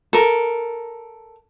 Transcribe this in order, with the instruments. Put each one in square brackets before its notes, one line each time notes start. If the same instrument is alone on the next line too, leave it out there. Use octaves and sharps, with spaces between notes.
[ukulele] A4 A#4